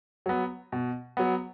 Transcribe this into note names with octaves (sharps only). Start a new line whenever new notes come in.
F#3 B3
B2
F#3 B3